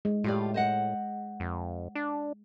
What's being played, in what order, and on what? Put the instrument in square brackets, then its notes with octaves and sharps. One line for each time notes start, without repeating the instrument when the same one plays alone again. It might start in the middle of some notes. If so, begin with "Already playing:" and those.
[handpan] G#3
[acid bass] A2 [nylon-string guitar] F4 G4 D5
[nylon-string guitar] C5 D#5 F#5
[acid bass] F2
D4